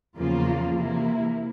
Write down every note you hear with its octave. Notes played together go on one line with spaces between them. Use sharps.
E2 C#3 F3 A#3 F4
C3 E3 A#3 E4